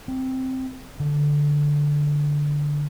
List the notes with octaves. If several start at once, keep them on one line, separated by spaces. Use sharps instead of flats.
C4
D3